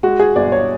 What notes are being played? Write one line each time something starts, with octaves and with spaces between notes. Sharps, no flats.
G#3 F#4
G#4
G1 D5
C#5